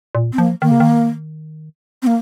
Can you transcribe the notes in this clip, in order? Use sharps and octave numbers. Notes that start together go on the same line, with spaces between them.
A#2
C4
F3 A#3
D#3 A#3
C#3
D#3
C4
A#3